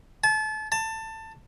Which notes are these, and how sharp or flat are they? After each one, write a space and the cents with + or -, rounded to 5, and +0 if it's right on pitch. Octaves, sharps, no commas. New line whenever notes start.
A5 -30
A5 +20